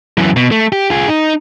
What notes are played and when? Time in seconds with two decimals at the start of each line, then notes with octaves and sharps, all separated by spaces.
0.18 F#2 E3
0.36 B2
0.52 A3
0.72 G4
0.90 F4 G#4
1.08 D#4